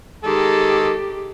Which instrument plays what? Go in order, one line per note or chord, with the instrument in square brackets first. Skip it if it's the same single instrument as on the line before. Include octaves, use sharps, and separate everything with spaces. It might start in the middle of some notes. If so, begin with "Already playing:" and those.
[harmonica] D#3 G#3 A4 [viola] G4